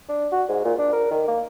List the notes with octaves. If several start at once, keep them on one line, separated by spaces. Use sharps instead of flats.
D4
F#4
G#2
A#2
D4
A#4
D#3
A#3